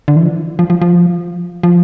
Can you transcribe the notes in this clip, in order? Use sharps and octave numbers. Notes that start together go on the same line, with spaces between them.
D3
E3
F3
F3
F3
F3
F3